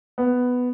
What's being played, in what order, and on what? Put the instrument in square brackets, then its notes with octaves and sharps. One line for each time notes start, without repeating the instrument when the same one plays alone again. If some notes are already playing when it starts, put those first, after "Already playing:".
[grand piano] B3